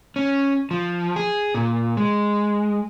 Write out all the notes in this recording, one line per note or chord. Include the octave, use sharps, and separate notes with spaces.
C#4
F3
G#4
A#2
G#3